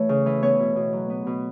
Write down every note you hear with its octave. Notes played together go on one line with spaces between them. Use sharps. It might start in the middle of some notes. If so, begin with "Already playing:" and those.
Already playing: E3 A3 C#5
C#3
E3
B3 C#5
B2
B2
F#3
B3
B2